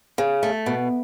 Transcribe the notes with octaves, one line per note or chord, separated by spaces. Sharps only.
C#3
A3
B2